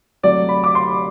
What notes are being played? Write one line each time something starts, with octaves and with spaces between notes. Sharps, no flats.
C2 C3 F#3 A3 D5
B5
D6
C6